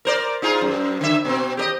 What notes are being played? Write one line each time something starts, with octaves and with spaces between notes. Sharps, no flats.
A#4 C5 D5
D#4 F4 G#4
F#2
D3 E5
B2 C4
G4 A#4 D#5